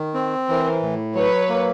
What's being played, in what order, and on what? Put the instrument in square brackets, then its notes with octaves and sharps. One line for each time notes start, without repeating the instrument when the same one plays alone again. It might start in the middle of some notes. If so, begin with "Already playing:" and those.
Already playing: [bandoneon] D#3
C4
[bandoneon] E3 [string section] A#4 C5
[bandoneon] A2
[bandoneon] F#3 [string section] B4 C#5
[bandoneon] A#3